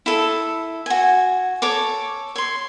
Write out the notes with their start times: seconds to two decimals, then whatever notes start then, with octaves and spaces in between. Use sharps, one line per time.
0.06 E4 A4
0.86 F#4 G#5
1.62 A4 C#5 C#6 D6
2.36 C#5 C6